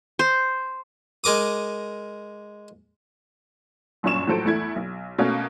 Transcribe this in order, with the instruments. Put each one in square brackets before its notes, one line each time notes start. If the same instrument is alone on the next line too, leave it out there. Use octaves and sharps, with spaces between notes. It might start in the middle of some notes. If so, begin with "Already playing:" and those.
[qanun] C5
[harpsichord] G#3 A#4 D6 D#6
[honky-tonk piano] G1 F#2 A#2 C#4 C#6 E7
A2 F3 F#3 A4 C5 D7
E2 A3 E4 G#6
B1
B2 A3 A#3 C#4